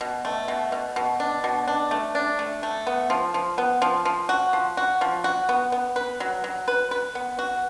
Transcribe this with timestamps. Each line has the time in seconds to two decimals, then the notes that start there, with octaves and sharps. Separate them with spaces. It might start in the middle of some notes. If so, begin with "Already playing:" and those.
0.01 B2
0.25 A3
0.48 B2
0.72 B2
0.96 B2
1.20 D4
1.44 B2
1.68 D4
1.91 A3
2.15 D4
2.39 A3
2.63 A3
2.87 B3
3.10 F3
3.34 F3
3.58 B3
3.82 F3
4.05 F3
4.29 F#4
4.53 F3
4.77 F#4
5.01 F3
5.24 F#4
5.49 B3
5.72 B3
5.96 B4
6.20 F#3
6.44 F#3
6.68 B4
6.91 B4
7.15 B3
7.39 F#4